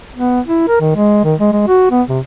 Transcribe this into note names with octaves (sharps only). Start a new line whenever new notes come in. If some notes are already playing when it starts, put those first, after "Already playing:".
B3
E4
A#4
D#3
G#3
D#3
G#3
G#3
F#4
B3
C3